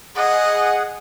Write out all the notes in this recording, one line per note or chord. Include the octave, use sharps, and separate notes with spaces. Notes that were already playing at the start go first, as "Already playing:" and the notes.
G#4 D#5 F#5